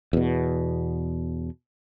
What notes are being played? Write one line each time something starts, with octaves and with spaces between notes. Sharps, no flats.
E2 B2